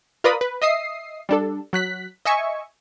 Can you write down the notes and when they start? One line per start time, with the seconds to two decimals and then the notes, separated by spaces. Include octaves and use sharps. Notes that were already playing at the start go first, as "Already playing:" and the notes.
0.24 F4 A#4 B4 D5 B5 D#6
0.41 B4
0.62 D#5 E5 D#6 C7
1.29 G3 D4 A4
1.73 F#3 F#6 B6
2.25 D#5 E5 G#5 C#6